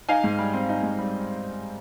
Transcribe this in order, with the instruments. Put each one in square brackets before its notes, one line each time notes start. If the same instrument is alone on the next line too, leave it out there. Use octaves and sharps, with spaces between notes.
[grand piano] D#4 F5 G#5
G#2
G3
C4
D#4
G#2
G3